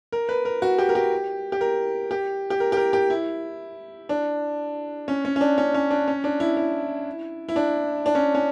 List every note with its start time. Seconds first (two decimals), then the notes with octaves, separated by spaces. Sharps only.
0.12 A#4
0.29 B4
0.45 A#4
0.62 F#4
0.79 G4
0.89 A#4
0.95 G4
1.52 G4
1.61 A#4
2.11 G4
2.50 G4
2.60 A#4
2.72 G4
2.77 A#4
2.93 G4
3.10 E4
4.09 D4
5.08 C#4
5.25 C#4
5.36 C#4
5.41 D4
5.58 C#4
5.74 C#4
5.91 D4
6.08 C#4
6.24 D4
6.40 E4
6.57 E4
7.49 E4
7.56 D4
8.06 D4
8.15 C#4
8.35 C#4